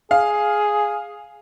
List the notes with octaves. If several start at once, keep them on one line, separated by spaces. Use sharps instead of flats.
G#4 F5